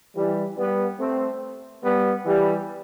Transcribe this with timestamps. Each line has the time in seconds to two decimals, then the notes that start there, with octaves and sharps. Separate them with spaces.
0.16 E3 G3
0.58 G3 B3
1.00 A3 C4
1.84 G3 B3
2.25 E3 G3